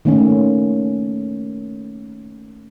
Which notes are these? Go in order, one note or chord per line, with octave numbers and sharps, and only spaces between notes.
D#3 A3 A#3 C#4